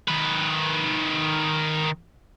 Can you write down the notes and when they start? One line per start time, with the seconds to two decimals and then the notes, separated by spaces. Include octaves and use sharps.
0.08 D#3 B4